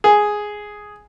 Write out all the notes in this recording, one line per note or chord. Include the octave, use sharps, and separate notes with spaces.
G#4